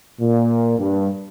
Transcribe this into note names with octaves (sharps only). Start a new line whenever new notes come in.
A#2
G2